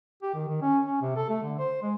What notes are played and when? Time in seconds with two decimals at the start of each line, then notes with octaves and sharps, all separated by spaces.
0.23 G4
0.34 D#3
0.48 D#3
0.62 C#4
0.86 C#4
1.01 C3
1.16 A4
1.29 A3
1.43 D3
1.59 C5
1.82 G#3